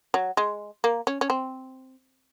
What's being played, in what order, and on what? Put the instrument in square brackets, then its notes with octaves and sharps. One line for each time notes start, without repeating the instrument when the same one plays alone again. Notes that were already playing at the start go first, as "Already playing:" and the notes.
[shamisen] F#3
G#3
A#3
C#4
C#4
C4